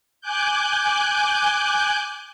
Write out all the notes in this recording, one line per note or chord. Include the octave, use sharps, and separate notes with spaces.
G#5 D6 F#6 G6